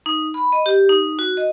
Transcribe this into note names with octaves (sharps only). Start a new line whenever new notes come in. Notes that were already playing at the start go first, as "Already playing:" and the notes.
D#4
B5
D#5
G4
D#4
F#4
D#5